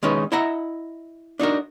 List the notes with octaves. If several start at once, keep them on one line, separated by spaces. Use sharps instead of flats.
D#3 G#3 C#4 D#4 B4
E4 D#5 E5 F#5 A#5
D4 D#4 F#4 A#4